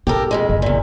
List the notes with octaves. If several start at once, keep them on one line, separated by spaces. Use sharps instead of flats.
B2 G4 A4 A#4
F2 G#2 G#3
F#1 C2
E2 A#2